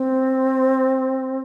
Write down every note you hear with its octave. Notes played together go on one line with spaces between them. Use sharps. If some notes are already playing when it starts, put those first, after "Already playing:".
Already playing: C4